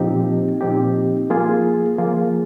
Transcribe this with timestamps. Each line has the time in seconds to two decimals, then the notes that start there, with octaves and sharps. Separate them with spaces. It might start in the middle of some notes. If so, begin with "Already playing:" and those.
Already playing: A#2 F3 C4 D#4 G4
0.61 A#2 F3 C4 D#4 G4
1.30 F3 A#3 F4 G#4
1.98 F3 A#3 F4 G#4